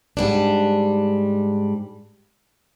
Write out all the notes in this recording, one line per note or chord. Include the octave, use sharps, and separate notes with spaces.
G#2 G3 D4